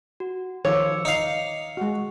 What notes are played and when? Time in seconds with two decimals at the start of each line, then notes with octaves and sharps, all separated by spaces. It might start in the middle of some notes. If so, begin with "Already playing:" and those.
0.20 F#4
0.65 D#3 F3 C#5 D6 E6 C#7
1.05 D#4 F5 C#7
1.77 G#3 F#4